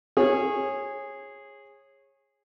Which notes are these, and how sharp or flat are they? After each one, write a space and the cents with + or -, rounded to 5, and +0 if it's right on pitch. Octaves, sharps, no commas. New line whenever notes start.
G#4 -15 C#5 -25